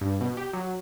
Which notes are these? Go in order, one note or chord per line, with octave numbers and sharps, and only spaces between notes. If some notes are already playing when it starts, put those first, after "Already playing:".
G2
B2
G4
F#3